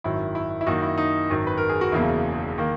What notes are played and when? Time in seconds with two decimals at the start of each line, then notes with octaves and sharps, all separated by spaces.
0.04 G#1 F#2 D#3 F#3 E4
0.35 E4
0.61 E4
0.67 F#2 D#3 A#3 D#4 F#4
0.82 E4
0.98 D#4
1.30 G#1 F#2 D#3
1.47 B4
1.58 A#4
1.69 G#4
1.81 F#4
1.92 E1 E2 C#3 F#3 A#3 E4
2.58 D#3 A#3